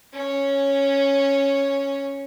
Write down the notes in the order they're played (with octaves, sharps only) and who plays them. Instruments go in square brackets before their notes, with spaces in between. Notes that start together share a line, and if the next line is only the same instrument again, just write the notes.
[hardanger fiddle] C#4 C#5